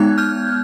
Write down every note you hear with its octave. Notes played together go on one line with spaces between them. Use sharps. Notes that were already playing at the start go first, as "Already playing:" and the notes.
Already playing: G#3 B3 D#4 F#6 G#6
F6 G6